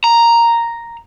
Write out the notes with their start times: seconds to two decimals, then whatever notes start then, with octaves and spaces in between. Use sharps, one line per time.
0.04 A#5